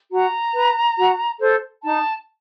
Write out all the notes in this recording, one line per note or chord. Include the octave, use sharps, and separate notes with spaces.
F#4 A#5
B4
F#4
A4 C5
D#4 A5